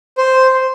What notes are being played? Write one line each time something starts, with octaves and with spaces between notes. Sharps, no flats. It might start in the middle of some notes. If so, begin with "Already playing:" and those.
C5